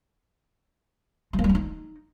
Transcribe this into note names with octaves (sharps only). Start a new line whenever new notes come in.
G#3
A#3
G3
B3
D#4